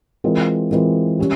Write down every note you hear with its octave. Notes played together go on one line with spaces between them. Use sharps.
E3 G#3 C4 F4 A#4
E3 G#3 C4 F4 A#4
G3 C#4